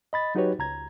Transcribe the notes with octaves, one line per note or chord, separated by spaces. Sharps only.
D#5 B5 A6
F#3 D#4 F#4 G4 B4 C#5
C#2 A#5 G#6